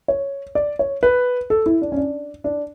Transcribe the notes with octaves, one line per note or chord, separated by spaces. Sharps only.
C#5
D5
C#5
B4
A4
E4
D4
C#4
D4
D4